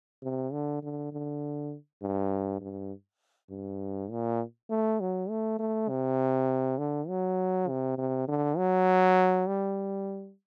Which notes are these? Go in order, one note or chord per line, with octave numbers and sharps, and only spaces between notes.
C3
D3
D3
D3
G2
G2
G2
A#2
A3
F#3
A3
A3
C3
D3
F#3
C3
C3
D3
F#3
G3